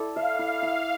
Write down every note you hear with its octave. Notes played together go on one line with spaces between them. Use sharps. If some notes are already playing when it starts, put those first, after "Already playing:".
Already playing: E4 A4 D5
E5 F5
E4
E4